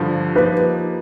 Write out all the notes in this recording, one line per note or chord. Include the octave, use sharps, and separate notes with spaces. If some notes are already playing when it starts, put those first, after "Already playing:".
Already playing: G2 D3 F3
F3 A#3 D#4 G4 B4